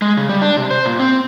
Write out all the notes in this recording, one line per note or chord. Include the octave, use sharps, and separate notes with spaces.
G#3
C#3
G3
D4
C3
C5
A#2
C4